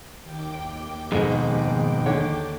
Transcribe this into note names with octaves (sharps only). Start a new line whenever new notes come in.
D#2 G5 D6
F2 G#2 B2 G#4
D3 C#5